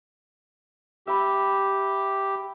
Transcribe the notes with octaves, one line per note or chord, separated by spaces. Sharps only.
G4 E5 B5